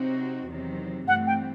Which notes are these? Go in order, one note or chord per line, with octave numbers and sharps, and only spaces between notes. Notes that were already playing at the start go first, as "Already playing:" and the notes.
Already playing: C3 F#3 C4 D#4 F#4
E2 C3 D#3 F#3 C4
G2 E3 A3 C4 F#5
G5